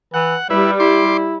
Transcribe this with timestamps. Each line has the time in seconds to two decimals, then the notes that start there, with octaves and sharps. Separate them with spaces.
0.14 E3 F#5
0.50 G3 E4 B4
0.80 E4 C6 D6